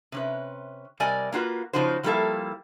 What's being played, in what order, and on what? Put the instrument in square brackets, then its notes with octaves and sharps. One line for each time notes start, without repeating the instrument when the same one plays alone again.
[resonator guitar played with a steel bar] C3 C#4 B4
C3 G3 A#4 D5 D#5 G#5
A#3 F4 F#4 B4
C#3 F3 D#4 F#4 C5
F3 G3 A#3 E4 A4 F5